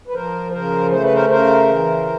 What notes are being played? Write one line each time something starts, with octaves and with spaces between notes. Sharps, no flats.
B4
F3 A#4 C5
C#3 A#4 C5
A3 C5
B4
A#4 C5
C#3 A#4 C5
E3